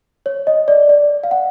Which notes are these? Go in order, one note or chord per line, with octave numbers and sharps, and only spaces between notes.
C#5
D#5
D5
D5
F5
F#5